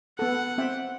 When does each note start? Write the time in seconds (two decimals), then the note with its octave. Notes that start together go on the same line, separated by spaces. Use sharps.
0.19 B3 A4 F#5
0.58 C4 E5 G5